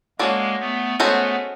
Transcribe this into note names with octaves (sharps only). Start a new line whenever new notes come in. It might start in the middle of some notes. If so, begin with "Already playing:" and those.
G#3 A#3 C#4 F#4 A4 D5
A3 B3
G#3 A3 B3 C#4 F#4 A4 C5